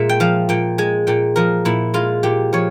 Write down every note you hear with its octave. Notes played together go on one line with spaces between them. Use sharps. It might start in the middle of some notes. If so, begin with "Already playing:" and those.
Already playing: A#2 G#3 E5
G5
F3 F5
A#2 G5
G#3 G#5
A#2 G5
F3 A#4
A#2 E4
G#3 F4
A#2 G4
F3 C#5